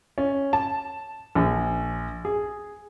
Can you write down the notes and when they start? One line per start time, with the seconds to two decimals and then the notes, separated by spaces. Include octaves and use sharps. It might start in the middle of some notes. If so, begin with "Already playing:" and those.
0.18 C#4
0.53 A5
1.35 A#1
2.25 G#4